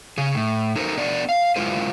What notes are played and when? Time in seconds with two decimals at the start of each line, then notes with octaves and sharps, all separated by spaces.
0.18 C#3 G#4
0.35 A2
0.76 D#4 A4 A#4 C5
0.98 B3 D4 A#4 D5
1.29 F5
1.56 G#3 E4 F4 A#4 C5